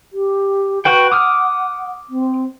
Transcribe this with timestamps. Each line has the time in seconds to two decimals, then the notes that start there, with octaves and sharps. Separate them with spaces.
0.13 G4
0.85 F#4 B4 F#5 G5
1.12 D6 D#6 F6
2.09 C4